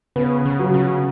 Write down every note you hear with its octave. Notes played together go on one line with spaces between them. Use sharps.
C#3 B3
C#3
F#3
C#3